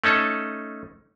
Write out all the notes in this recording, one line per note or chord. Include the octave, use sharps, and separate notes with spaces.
A3 C#4 D#4 A4